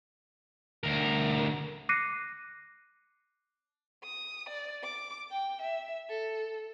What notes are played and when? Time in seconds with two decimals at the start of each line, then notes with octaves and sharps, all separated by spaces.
0.84 D2 A#4
1.89 D6 F#6 A#6 C7 C#7 D#7
4.03 D#6
4.49 D5
4.83 D6
5.31 G5
5.62 E5
6.09 A4